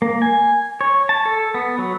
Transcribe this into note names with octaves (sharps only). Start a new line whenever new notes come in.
A#3
G#5
C#5
A5
A4
B3
F#3